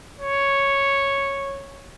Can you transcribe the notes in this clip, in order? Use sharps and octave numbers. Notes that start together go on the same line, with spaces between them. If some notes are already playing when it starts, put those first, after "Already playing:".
C#5